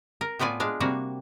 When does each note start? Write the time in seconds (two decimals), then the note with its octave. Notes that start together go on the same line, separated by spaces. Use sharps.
0.21 A#4
0.39 A2 B3 F4 D5 G#5
0.60 G#3 D4 F5
0.80 C3 G3 A#3 F#4